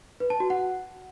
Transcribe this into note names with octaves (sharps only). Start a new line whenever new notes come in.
B4
A5
F#4
F#5